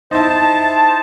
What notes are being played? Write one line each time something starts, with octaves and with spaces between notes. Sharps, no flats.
D#4 E4 C5 A5